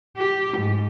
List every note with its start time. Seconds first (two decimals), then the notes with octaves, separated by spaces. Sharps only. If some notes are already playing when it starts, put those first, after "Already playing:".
0.17 G4
0.57 G#2